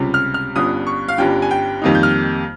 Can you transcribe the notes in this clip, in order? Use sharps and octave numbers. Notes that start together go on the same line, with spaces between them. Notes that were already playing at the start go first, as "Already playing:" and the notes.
Already playing: C#2 C3 G3 C#4 F4
F6
F6
G1 G2 G3 C#4 F4 D#6
C#6
F5
G1 G2 G3 C#4 F4 G5
G#5
G5
F2 D#3 G3 A#3 D#4
G6
F6